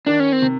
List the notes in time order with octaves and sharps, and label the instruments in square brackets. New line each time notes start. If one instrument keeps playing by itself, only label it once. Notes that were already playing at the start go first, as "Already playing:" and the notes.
[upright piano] D#3 [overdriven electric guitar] D4
[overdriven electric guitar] C#4
C4
[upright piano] C3